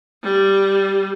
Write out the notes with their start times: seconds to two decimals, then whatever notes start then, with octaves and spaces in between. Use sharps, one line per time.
0.23 G3